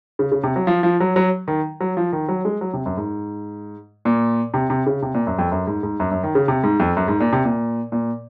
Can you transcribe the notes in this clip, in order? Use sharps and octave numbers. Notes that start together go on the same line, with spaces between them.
C#3
C#3
C3
F#3
F3
F3
F#3
F#3
D#3
F#3
F3
D#3
F#3
G#3
F#3
C3
F#2
G#2
A#2
C3
C3
C#3
C3
A#2
F#2
F2
F#2
G#2
G#2
F#2
F#2
D#3
C#3
C3
G#2
F2
F#2
G#2
A#2
C3
A#2
A#2